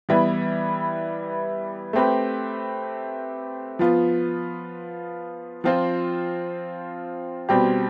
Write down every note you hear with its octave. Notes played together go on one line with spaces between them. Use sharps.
E3 G3 B3 E4 B4
A3 C4 G4 B4
F3 B3 F4
F3 C4 F4 C5
B2 G3 C4 G4